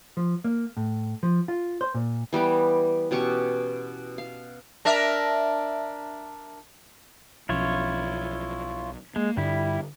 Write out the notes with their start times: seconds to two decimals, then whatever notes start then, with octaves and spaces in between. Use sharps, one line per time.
0.17 F3
0.44 A#3
0.77 A2
1.23 F3
1.48 F4
1.81 C5
1.94 A#2
2.32 E3 G3 B3 G4
3.11 B2 C#4 G4 C#6
4.18 F5
4.85 D4 A#4 E5
7.49 B1 F3 C#4 E4 F4 C#5
9.16 G#3 A#3
9.37 G2 D3 G3 E4